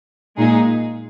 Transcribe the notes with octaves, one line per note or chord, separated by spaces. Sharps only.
A#2 G#3 D#4 G#4